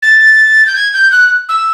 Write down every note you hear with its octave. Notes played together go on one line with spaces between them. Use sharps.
A6
G6
G#6
G6
F#6
E6